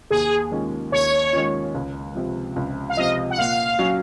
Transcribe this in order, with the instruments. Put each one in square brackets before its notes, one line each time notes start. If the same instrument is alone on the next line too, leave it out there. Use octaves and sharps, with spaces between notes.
[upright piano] D#2 [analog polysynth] G#4
[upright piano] D#3 G#3 C#4 F4
[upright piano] D#2 [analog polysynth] C#5
[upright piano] D#3 G#3 C#4 F4
C#2
C3 F3
C#2
[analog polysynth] F5
[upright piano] C3 F3 [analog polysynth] D#5
[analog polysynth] F#5
[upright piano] A#2 [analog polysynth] F5
[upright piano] F#3 C#4 F#4